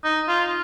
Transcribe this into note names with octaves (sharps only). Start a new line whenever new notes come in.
D#4
F4